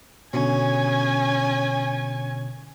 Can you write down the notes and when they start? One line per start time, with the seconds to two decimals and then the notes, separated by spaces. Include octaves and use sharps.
0.34 B2 D3 C#4 G#5